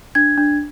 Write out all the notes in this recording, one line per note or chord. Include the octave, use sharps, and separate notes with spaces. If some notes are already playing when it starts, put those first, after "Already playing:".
D4 G#6
D4